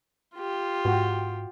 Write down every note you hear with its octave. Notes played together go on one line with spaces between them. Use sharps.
F4 G4
G#2 F#4 G5